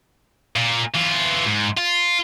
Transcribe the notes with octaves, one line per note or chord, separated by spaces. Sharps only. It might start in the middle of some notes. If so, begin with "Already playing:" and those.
A#2
E3 F4
G#2
F4